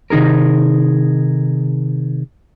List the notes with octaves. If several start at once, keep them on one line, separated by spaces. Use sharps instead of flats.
C3 D#3 D#4 G#4 A#4